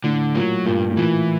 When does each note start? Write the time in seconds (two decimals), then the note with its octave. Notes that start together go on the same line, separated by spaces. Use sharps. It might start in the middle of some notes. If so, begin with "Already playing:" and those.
0.04 A2 D3
0.35 A#2 F#3
0.66 G2 A#2
0.91 A2
0.96 A#2 E3